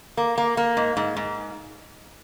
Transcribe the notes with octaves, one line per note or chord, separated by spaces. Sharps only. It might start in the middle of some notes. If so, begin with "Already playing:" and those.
A#3
A#3
A#3
G#2
G#2
G#2